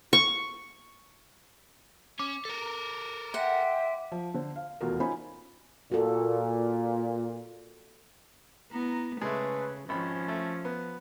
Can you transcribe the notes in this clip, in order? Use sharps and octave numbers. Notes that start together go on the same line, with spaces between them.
C#6
C#4 D6
A4 A#4
E5 F#5 G5 C6
F3
D3 C5
F5
F1 E2 B2 F4 F#4 A#4
C#4 D#4 F4 C5 G#5 B5
A#2 F#4 A4
B3 E4 A#5
C#3 G#3 A3 B4
G#1 F3 C#4 B5
A3
B3